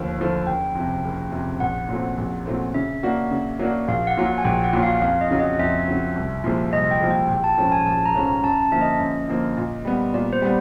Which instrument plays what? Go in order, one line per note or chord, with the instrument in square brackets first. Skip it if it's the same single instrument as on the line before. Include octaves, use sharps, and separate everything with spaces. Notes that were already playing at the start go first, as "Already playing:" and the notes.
Already playing: [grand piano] D#2 D3 F3 A3
D3 F3 A3
[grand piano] F#1 [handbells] G5
[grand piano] F2 C3
F#1
F2 C3
[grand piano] A#1 [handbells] F#5
[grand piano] A#2 F#3 A3 C4
A#1
A#2 F#3 A3 C4
[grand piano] C#3 [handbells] E5
[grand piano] F#3 A#3 D4 F#4
C#3
F#3 A#3 D4 F#4
[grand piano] A#1 [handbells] F5
[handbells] F#5
[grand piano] A#2 F#3
[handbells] F#5
G#5
[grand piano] A#1 [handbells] G5
[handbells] F#5
[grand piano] A#2 F#3
[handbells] F5
[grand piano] F2 [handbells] F5
[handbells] D#5
[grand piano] C#3 F#3
[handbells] D#5
[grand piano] F2 [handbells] E5
[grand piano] C#3 F#3
C2
A#2 F3 G#3
[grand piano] C2 [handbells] D#5
[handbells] G5
[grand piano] A#2 F3 G#3
[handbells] G5
[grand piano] A#1 [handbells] G5
[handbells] A5
[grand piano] G#2 F3 A3 C#4 [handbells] A5
[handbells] G#5
[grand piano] A#1 [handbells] A5
[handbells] A#5
[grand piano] G#2 F3 A3 C#4
[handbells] A#5
[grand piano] F#2 [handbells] A5
[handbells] A5
[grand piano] D3 F3 A#3 [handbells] E5
[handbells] D#5
[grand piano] F#2
D3 F3 A#3
A#2
G3 B3
[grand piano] A#2 [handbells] D5
[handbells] C5
[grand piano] G3 B3